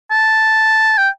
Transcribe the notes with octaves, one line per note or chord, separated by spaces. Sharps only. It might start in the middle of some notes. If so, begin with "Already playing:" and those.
A5
G5